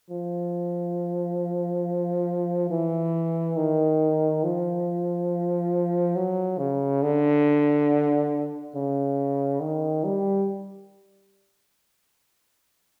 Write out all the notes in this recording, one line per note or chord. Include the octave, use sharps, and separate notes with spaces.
F3
E3
D#3
F3
F#3
C#3
D3
C#3
D#3
G3